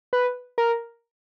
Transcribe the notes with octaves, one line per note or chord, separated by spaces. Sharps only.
B4
A#4